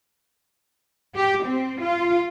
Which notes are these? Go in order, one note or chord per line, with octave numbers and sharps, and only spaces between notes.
G4
C4
F4